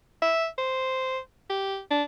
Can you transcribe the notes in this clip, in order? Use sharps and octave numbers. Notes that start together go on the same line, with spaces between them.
E5
C5
G4
D4